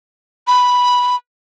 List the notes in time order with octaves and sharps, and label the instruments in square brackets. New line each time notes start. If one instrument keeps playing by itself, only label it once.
[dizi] B5